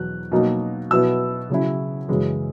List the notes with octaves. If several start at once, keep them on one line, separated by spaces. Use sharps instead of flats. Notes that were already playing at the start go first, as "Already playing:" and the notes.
Already playing: E2 B2 F#3 F#6
B2 F#3 A#3 D#4
B2 F#3 B3 E4 E6
C#3 F#3 C#4 E4
F#2 C#3 E3 G#3